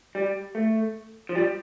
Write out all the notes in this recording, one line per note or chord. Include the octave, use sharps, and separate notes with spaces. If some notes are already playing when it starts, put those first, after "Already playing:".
G3
A3
F3
G3